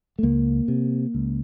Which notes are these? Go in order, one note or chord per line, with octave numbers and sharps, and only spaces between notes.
A3
C#2 A#3
C3
C#2